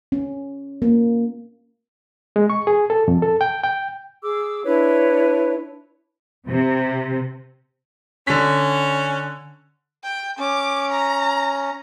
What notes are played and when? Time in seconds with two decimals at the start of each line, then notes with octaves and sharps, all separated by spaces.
0.12 C#4
0.82 A#3
2.36 G#3
2.50 C#6
2.67 G#4
2.90 A4
3.08 F2
3.22 A4
3.41 G5
3.63 G5
4.23 G#4 D6 E6
4.64 D4 E4 B4 C#5
6.47 C3
8.27 D3 C#4 B6
10.04 G5
10.39 C#4 D6
10.92 A#5